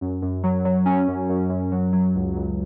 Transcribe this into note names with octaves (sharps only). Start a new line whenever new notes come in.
F#2
F#2
F#3
F#3
C#4
F#2
F#2
F#2
F#3
F#3
C#2
C#2